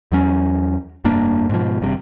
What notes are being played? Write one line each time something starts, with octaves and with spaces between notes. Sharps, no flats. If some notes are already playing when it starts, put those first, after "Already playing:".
E2 F#3 C#4
F1 G2 A#3 D4
G#2 B2 F3
G#1 G2 C3